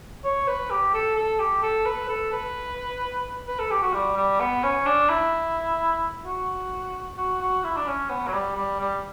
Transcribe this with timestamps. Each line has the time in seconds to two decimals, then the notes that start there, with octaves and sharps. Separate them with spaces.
0.24 C#5
0.47 B4
0.71 G4
0.94 A4
1.16 A4
1.39 G4
1.62 A4
1.85 B4
2.09 A4
2.33 B4
3.48 B4
3.59 A4
3.71 G4
3.82 F#4
3.94 G3
4.17 G3
4.40 B3
4.63 C#4
4.86 D4
5.10 E4
6.25 F#4
7.17 F#4
7.41 F#4
7.64 E4
7.77 D4
7.87 C#4
8.10 B3
8.27 F#3
8.33 G3
8.56 G3
8.80 G3